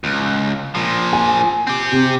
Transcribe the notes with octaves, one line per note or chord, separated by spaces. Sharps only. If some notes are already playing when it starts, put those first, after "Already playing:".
C#2
A#2 F3
G#5
C4 G4
C3